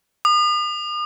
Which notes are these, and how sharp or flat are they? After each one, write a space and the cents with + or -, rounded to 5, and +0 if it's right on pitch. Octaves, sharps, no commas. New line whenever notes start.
D#6 -45